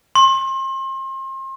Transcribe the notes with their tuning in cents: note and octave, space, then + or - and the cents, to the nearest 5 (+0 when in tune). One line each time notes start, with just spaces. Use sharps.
C6 +35